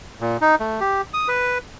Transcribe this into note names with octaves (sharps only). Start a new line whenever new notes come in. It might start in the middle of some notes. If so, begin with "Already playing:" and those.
A#2
D#4
A3
G4
D#6
B4